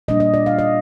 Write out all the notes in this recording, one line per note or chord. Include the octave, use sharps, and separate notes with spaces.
A#2 G3 A#3 D4 D#5
D#5
D5
F5
D#5